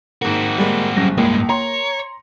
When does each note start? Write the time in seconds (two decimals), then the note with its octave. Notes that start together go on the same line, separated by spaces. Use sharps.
0.22 G#2 A#3 C4 F#4
0.58 G3 G#3 A#3
0.97 F#1 F#3 G3 C#4 A#6
1.17 C#2 G2 G#3 A#3
1.49 C#5 A#5 C6